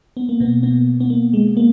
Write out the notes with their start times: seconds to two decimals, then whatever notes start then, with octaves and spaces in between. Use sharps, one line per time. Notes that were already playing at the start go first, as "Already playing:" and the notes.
0.17 B3
0.29 A#3
0.40 B2 B3
0.63 B2 B3
1.00 B3
1.10 A#3
1.33 G#3
1.57 A#3